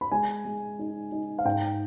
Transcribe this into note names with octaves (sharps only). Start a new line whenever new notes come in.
B5
G#3 G#5
G#3
D#4
D#4
F5
G#2 G5